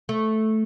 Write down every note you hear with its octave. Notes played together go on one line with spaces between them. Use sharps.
A3